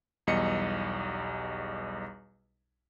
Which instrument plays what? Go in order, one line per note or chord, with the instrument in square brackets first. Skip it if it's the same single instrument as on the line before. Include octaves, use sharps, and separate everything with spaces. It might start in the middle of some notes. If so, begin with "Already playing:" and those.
[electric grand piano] B1 E2 G3 D#5 C#7